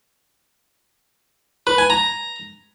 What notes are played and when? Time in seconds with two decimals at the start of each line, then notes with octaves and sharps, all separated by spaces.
1.67 B4
1.78 G#5
1.90 A#5